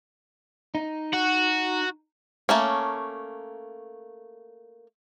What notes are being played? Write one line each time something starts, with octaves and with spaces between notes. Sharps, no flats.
D#4
F#4
A3 A#3 C#4